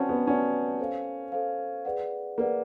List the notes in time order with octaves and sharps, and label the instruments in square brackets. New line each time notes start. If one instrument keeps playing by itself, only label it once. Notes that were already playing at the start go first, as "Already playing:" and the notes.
Already playing: [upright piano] C4 C#4 [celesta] F#4 B4 D5 F#5 A5
[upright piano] B3
[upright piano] C#4 [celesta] F#4 B4 D5 F#5 A5
[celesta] A4 C5 F5
A4 C5 F5
G#4 B4 D5 F#5
[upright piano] A#3 [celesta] G#4 B4 D5 F#5